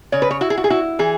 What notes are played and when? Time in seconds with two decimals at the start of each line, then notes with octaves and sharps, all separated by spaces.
0.12 C#3 C#5
0.22 B4
0.31 C#5
0.41 E4 F#4
0.50 G#4
0.58 F#4
0.64 G#4
0.70 E4 F#4
0.99 E3 G#4